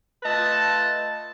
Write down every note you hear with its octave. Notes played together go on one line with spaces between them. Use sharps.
A3 F4 B4 D#5 A5